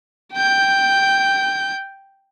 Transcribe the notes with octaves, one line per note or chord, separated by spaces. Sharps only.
G5 G6